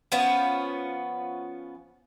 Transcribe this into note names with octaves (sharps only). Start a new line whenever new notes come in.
F3 B3 C#4